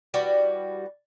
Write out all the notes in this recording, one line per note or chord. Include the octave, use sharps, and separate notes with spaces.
E3 G3 F#4